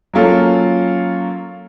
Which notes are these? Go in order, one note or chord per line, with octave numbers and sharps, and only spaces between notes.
F#3 A#3 C#4 F4 A4